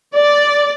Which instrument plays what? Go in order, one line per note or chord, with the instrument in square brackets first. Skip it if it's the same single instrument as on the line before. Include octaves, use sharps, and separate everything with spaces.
[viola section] D5